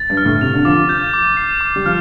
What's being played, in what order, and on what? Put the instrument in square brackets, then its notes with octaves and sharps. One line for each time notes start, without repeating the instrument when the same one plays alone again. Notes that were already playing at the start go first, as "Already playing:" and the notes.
Already playing: [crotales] A6
[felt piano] G2
[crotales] F6
[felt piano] A2
[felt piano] C3 [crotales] F7
[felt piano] D3
[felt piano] F3 [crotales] D6
[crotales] G6
D6
C7
D6
[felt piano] G3
[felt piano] F3 [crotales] F6